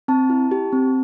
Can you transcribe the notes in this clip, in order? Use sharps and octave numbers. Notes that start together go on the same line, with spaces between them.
C4 A5
E4
G4
C4